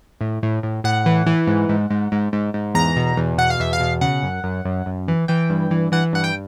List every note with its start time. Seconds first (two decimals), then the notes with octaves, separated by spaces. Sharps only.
0.21 A2
0.43 A2
0.63 A2
0.84 A2 F#5
1.06 E3
1.26 E3
1.47 G#2
1.69 G#2
1.90 G#2
2.12 G#2
2.33 G#2
2.54 G#2
2.74 E2 A#5
2.96 B2
3.17 E2
3.38 B2 F#5
3.50 F5
3.60 E2 E5
3.73 F5
3.80 B2
4.01 C#3 F#5
4.23 F#2
4.44 F#2
4.65 F#2
4.86 F#2
5.08 E3
5.28 E3 G5
5.50 G2
5.71 E3
5.92 E3 F#5
6.13 G2 F#5
6.24 G5